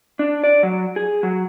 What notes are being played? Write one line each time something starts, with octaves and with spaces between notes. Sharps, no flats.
D4
D5
F#3
G#4
F#3